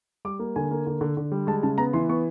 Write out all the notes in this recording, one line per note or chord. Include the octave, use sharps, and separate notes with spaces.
G3 D6
A#3
D3 G#5
A#3
D3
D3
D3
G3
G#3 A5
C#3 A5
B3 A#5
E3 C6
B3 C#6